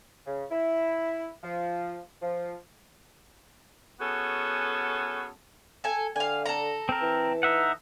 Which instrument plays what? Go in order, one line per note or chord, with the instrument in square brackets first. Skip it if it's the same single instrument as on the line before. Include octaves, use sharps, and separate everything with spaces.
[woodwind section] C#3
E4
F3
F3
[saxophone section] B3 C#4 F#4 G#4 A4
[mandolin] A4 G#5
[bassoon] D3 [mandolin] F5 G#5
[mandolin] A4 A#5
[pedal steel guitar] C4 A#4
[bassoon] E3
[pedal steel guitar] D#4 E5 F#5